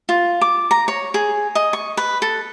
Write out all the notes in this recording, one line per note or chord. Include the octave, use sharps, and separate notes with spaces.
F4
D6
A#5
C#5
G#4
D#5
C#6
B4
A4